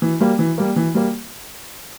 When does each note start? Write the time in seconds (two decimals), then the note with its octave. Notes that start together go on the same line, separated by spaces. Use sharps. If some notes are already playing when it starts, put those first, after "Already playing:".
0.02 E3
0.21 G3 A#3
0.39 E3
0.58 G3 A#3
0.76 E3
0.95 G3 A#3